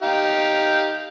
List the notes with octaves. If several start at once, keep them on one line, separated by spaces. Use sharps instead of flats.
D#4 G4 F5